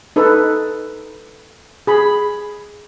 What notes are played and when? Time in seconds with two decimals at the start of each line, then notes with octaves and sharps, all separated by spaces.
0.16 D#4 A4 B4
1.87 G#4 B5